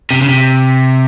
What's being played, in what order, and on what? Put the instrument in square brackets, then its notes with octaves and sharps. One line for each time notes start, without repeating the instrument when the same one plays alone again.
[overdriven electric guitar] C3
C#3
C3